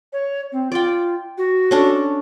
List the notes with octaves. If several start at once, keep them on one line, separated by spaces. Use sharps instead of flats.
C#5
C4
F4 D5 G5
F#4
C#4 D4 A4